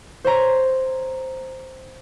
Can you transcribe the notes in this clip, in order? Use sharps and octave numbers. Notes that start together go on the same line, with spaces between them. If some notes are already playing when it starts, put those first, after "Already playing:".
C5 C#5 A#5